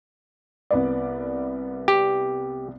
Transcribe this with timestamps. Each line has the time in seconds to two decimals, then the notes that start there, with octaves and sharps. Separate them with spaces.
0.71 C2 B3 D5
1.88 G4